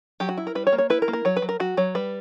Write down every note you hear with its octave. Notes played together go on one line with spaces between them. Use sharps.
F#3 G4
F#4
E4
A#4
G3 B4
C#5
A#3
C#5
E4 B4
A#4
A#3
A#4
F#3 C#5
B4
F#3
A#4
F#3 F#4
F#3 C#5
G3 B4